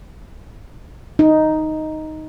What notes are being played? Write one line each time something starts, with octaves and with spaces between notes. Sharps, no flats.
D#4